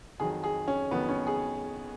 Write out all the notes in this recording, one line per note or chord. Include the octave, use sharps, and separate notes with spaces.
F2 D#3 F#3 G#4
G#4
C#4
F2 D#3 F#3 B3
C#4
G#4